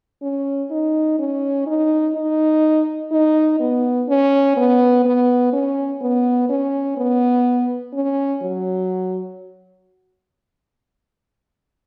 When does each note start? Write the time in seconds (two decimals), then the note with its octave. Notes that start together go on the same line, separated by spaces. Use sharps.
0.22 C#4
0.71 D#4
1.19 C#4
1.67 D#4
2.15 D#4
3.11 D#4
3.60 B3
4.09 C#4
4.57 B3
5.05 B3
5.53 C#4
6.01 B3
6.49 C#4
6.97 B3
7.94 C#4
8.42 F#3